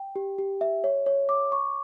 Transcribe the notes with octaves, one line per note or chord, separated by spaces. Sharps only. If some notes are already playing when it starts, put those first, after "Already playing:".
Already playing: G5
G4
G4
E5
C#5
C#5
D6
C#6